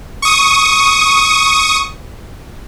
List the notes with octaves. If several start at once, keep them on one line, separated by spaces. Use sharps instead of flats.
C#6 D#6